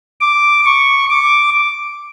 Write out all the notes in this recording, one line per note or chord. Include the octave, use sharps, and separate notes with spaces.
D6
C#6
D6